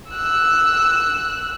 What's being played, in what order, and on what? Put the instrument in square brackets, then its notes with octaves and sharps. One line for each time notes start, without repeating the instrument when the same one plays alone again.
[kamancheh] E6 F#6